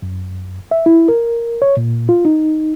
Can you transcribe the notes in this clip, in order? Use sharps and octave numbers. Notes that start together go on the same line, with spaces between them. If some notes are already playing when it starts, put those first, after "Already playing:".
F#2
E5
E4
A#4
C#5
A#2
F4
D#4